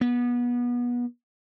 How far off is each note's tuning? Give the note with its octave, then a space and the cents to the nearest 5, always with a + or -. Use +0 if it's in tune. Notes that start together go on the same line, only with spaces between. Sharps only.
B3 -25